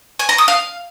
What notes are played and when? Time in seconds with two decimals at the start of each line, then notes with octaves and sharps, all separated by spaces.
0.19 G#5
0.29 A#5
0.38 D#6
0.48 F5